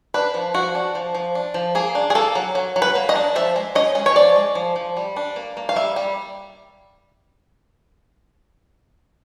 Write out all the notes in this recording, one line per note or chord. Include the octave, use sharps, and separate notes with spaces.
D4 B4
F3
F3 F#4
D4
F3
F3
D4
F3
A#3 G#4
D4
G#4
A#3 A4
F#3
F#3
F#3
B4
A#3
D#5
D4
F3 E5
G#3
C#4 D#5
G#3
C#5
F3 D5
G#3
F3
F3
G3
D4
A#3
A#3
F5
G3 E5
G3